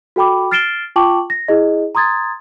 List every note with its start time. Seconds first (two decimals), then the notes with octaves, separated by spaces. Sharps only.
0.16 F#4 A4 G5 B5 D6
0.51 F6 A6 C7 D7 E7 G7
0.96 F4 G5 A5 C#6 D6 F#7
1.30 A#6
1.48 E4 G#4 D#5
1.95 A#5 C6 D#6 G#6 A6